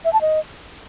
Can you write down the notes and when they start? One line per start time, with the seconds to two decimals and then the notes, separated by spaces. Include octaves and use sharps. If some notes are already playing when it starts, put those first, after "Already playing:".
0.05 E5
0.13 A5
0.21 D#5